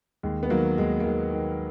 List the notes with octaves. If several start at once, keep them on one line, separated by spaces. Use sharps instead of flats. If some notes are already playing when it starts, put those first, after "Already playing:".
D#2 G#3
B3
D#3 F#3 A#3
D#2 G#3
A#3
D#3 G#3
D#3